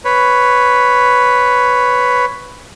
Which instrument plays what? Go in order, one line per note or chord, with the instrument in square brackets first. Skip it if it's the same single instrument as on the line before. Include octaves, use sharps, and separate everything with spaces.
[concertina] B4 C#5